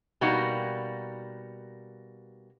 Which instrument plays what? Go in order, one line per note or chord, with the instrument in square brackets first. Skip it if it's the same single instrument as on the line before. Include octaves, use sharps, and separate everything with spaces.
[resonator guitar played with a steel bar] B2 G3 A#3 D#4 F#4